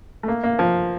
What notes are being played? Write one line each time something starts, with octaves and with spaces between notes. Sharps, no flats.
A3
A#3
A#3
F3